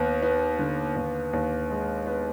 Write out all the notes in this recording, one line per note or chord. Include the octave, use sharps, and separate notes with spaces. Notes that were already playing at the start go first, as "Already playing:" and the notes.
Already playing: D#2 B3
B3
D3
D#2
D#2
G#3
B3